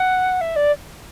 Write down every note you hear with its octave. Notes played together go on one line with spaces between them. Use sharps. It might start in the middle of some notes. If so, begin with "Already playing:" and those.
Already playing: F#5
E5
D5